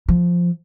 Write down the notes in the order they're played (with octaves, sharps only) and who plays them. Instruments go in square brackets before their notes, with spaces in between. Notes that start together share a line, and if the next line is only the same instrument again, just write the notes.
[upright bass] F3